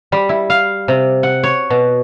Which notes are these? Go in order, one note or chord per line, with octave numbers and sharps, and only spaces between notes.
G3
E4
F5
C3
F#5
C#5
B2